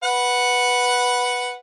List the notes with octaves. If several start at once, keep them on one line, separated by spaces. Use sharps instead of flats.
B4 F#5